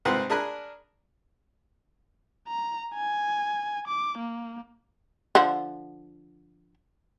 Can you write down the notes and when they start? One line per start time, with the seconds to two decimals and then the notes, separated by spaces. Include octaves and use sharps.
0.05 C2 G#2 C4 A#4 B4 F#5
0.30 D4 G#4 A#4 G#5 B5 F#6
2.48 A#5
2.95 G#5
3.88 D6
4.18 A#3
5.35 D3 F3 F#5